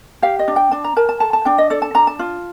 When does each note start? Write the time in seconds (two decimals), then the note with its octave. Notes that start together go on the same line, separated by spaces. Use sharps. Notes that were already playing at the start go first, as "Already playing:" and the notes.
0.22 G4 F5
0.39 D#5
0.48 D4
0.56 G5
0.71 D4 A5
0.84 A#5
0.96 A#4 A5
1.09 A5
1.20 A4 A5
1.33 A5
1.45 D4 G5
1.58 D#5
1.70 A4 D5
1.82 A5
1.94 D4 A#5
2.07 A5
2.19 F4